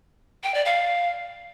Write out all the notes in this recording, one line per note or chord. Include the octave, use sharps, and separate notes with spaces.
G5
D5
F5